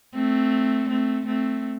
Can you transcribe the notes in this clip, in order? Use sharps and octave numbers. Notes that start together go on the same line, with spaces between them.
A3 C4
A3 C4
A3 C4